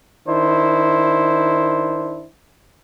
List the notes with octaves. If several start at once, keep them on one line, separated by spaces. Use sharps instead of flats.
D#3 D4 E4 C5